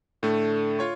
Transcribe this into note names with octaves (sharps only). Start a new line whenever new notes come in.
A2 D3 A3
F4 C#5 C#6